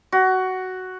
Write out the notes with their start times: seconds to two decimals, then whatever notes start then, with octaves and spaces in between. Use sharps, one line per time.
0.12 F#4